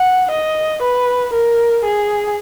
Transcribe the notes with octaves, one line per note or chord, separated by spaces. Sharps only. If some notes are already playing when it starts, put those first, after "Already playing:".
Already playing: F#5
D#5
B4
A#4
G#4